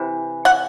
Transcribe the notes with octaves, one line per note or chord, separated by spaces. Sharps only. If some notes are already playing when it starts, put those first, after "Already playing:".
Already playing: C3 E3
F#5